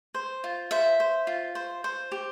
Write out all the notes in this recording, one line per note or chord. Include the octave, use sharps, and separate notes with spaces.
C5
F4
C5 E5
C5
F4
C5
C5
G4